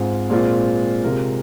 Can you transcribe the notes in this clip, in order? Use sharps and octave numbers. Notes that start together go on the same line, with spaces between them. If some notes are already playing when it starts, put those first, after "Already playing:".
Already playing: G#2 G#3 C4 F4
A#2 G#3 C4 F4
C3 G#3 F4 A#4